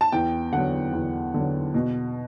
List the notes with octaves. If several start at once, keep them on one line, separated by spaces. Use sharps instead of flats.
A5
E2 G5
D3 F#3 F#5
E2
D3 F#3
B2